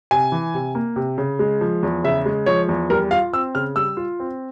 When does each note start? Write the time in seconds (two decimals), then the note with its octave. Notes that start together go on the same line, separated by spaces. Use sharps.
0.11 C3 G#5
0.32 E3
0.54 C3
0.75 A#3
0.96 C3
1.18 C#3
1.39 G#3
1.61 F3
1.83 E2
2.04 C#3 E5
2.26 G#3
2.46 F3 C#5
2.69 E2
2.90 G3 A#4
3.11 F4 F5
3.33 C4 E6
3.55 C#3 F6
3.76 G3 E6
3.97 F4
4.20 C4